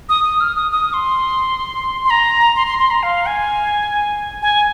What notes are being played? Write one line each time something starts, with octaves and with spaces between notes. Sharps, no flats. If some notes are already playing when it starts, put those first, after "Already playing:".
D#6
D#6
F6
D#6
D#6
C6
C6
A#5
C6
C6
C6
A#5
F5
G#5
G#5